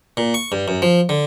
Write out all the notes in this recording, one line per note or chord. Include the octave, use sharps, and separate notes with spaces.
A#2
C#6
G2
F#2
F3
D3